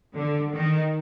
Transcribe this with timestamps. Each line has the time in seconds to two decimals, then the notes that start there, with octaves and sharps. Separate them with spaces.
0.14 D3
0.52 D#3